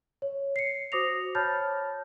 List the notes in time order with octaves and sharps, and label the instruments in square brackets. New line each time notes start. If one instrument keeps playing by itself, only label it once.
[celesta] C#5
C7 C#7
F#4 C5 D6 D#6 A#6 F7
C#5 A5 B5 F6 G6 A6